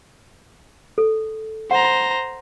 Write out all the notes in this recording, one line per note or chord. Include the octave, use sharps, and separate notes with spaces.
A4
C5 F#5 A#5